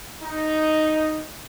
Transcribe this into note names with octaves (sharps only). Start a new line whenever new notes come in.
D#4